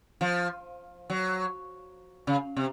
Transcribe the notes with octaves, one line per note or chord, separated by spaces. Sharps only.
F3
F#3
C#3
C3